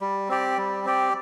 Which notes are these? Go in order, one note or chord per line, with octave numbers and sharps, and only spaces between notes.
G3
C4 G4 D5
G3
C4 G4 D5